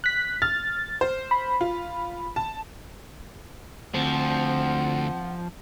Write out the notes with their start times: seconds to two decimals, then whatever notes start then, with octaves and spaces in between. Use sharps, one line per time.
0.04 F#6 B6
0.42 F6 A6
1.01 C5
1.31 B5
1.61 F4
2.36 A5
3.94 D2 F3 C4 F#5